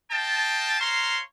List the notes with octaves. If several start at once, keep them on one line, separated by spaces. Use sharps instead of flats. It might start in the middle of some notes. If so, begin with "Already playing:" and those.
D#5 F5 G5 A5
C5 C#5 F5 A#5 C6